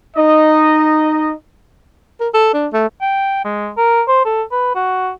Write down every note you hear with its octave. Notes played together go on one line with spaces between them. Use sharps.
D#4 D#5
A#4
A4
D4
A3
G5
G#3
A#4
C5
A4
B4
F#4